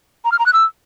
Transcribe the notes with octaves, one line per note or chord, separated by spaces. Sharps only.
A#5
F6
A#5
F#6
E6